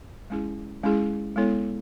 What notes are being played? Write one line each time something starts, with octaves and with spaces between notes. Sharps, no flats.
G#3 C#4 E4 G#4
G#3 C#4 E4 G#4
G#3 B3 E4 A4 C#5